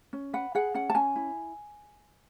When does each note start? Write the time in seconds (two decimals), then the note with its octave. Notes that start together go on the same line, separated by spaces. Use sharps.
0.13 C#4
0.33 B4 F#5
0.55 G#4 F#5
0.74 C#4 F#5
0.90 A5
0.95 C#4 G#5
1.16 E4